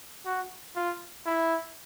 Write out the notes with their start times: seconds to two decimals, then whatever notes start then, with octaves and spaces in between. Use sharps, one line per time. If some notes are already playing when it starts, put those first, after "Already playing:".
0.25 F#4
0.76 F4
1.26 E4